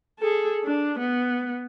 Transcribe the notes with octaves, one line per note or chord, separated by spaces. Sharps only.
G#4 A4
D4
B3